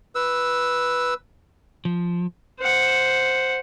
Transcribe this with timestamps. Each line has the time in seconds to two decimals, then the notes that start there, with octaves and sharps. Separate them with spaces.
0.15 B4 E6
1.85 F3
2.59 C5 F#5